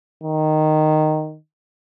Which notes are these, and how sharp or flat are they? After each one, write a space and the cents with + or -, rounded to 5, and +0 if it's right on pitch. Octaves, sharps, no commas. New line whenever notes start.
D#3 -10